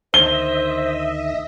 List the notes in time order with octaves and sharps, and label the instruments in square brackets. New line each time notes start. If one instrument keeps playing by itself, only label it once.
[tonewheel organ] D2 D#3 [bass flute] C5 [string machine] D#5 E5 [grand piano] G7